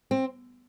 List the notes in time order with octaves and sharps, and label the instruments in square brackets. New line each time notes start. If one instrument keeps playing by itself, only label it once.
[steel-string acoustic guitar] C4